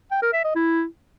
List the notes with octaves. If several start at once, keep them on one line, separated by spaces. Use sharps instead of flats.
G5
A#4
E5
D#5
E4